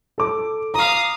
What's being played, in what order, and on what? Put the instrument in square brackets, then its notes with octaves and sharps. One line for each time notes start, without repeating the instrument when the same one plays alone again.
[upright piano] A4 D6
[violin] F5 D#6 [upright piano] A#5